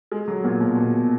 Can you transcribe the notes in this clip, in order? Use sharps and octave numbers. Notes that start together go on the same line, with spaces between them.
G#3
F#3
A#2
B2
B2